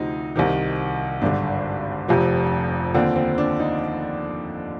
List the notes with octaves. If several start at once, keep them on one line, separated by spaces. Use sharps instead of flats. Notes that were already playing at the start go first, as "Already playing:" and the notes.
Already playing: D2 C3 F3 D#4
C2 C3 D#3
G#1 G2 D3 D4
F1 F2 C3 F3
D#2 D3 F3 C4
C4
D4
D#4